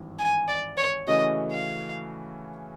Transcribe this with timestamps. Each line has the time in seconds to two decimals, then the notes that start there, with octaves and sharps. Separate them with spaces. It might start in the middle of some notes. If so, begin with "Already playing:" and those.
Already playing: G#1 G2 E3
0.19 G#5
0.48 D5
0.77 C#5
1.07 C#3 E3 A3 C#4 F#4 D#5
1.52 F5